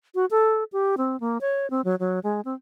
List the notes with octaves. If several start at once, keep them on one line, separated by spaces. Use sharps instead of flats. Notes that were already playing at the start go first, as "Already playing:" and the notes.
F#4
A4
G4
C4
A#3
C#5
C4
F#3
F#3
G#3
C4